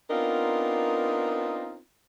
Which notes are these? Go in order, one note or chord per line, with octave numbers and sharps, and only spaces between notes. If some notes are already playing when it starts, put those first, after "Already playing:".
B3 C4 D4 D#4 F4 A#4